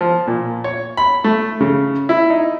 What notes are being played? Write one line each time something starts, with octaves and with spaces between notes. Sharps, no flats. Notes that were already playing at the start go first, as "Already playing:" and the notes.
F3
A#2
C#5
B5
A3
C#3
E4
D#4